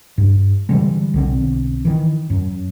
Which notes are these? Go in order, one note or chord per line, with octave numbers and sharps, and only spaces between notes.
G2
D3 E3 G3 G#3
B1 D3 C4
D#3 E3
F#2